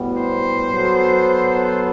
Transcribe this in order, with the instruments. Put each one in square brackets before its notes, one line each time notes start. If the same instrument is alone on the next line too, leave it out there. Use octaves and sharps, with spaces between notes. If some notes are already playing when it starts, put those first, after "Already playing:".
Already playing: [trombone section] A2 G3 B3 F#4
[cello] C5
[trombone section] F#3 B3 F#4 A4